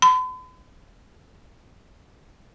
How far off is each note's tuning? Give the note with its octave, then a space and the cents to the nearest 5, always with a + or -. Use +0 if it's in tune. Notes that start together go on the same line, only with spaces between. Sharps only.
B5 +45